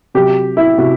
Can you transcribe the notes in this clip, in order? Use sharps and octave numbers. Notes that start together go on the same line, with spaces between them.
C3 F#3 G4
E4
C3 F#4